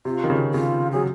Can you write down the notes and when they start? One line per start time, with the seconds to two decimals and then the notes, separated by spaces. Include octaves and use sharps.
0.05 C3 F4
0.24 D#3
0.30 C#3
0.54 C#3 F4
0.92 F#3 G#4